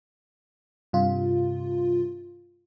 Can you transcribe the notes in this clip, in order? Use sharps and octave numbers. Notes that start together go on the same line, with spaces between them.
G2 C3 F4